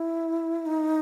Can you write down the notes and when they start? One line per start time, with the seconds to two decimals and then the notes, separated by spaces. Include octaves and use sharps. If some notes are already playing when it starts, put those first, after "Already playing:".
Already playing: E4
0.66 D#4